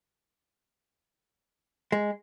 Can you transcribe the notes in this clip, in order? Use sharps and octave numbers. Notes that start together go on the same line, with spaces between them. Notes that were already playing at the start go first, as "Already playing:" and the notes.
G#3